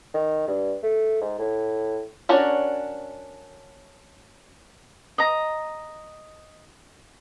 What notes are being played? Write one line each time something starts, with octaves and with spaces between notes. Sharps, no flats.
D#3
G2
A3
G#2
A2
C#4 D4 F#4 A#4 C#5
D#5 A#5